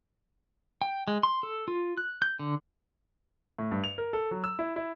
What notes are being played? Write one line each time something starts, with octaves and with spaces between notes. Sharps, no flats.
G5
G#3
C6
A4
F4
F#6
G6
D3
A2
G2
F7
A#4
A4
F#3
E6
E4
E4